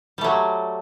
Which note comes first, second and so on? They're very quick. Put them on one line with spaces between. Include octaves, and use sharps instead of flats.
G3 A3 F#3